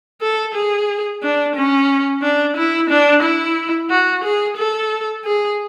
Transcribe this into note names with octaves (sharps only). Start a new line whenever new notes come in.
A4
G#4
D4
C#4
D4
E4
D4
E4
F#4
G#4
A4
G#4